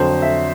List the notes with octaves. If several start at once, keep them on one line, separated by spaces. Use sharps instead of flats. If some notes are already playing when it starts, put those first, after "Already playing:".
Already playing: F2 D3 F#3 C5
E5